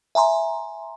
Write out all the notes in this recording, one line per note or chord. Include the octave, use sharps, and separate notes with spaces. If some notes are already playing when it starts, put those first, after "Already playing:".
E5 G#5 A#5 C6